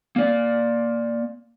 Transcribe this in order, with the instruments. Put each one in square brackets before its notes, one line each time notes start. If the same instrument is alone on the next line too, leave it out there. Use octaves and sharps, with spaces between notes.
[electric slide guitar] A#3 D5